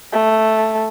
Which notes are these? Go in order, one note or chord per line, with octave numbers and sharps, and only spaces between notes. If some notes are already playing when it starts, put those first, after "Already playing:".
A3